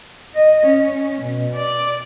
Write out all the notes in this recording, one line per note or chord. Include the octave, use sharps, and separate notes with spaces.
D#5
C#4
B2
D5